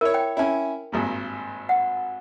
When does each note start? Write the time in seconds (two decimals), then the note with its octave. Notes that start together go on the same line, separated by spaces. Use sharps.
0.01 E4 A#4 C#5
0.14 G5
0.37 C#4 E4
0.92 G#1 G2 A#2
1.69 F#5